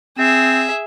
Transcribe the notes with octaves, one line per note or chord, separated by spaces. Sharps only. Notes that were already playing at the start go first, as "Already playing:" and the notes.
C4 G#4 E5